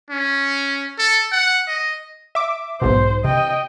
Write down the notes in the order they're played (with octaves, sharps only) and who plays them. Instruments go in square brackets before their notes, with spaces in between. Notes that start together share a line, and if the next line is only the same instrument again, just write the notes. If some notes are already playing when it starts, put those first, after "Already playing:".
[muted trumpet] C#4
A4
F#5
D#5
[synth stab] E5 D6
[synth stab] B1 G#2 B2 [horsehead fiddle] C5
[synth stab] C3 [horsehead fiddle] D#5 G5